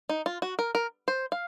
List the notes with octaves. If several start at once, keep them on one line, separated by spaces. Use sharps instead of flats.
D#4
F4
F#4
A#4
A#4
C5
F5